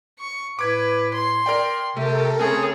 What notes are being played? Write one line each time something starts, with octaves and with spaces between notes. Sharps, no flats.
C#6
A2 B4 D6 G#6
C6
A#4 D5 G5
C3 A3 G4 A4 A#4
C#3 A3 C4 G#4 C#5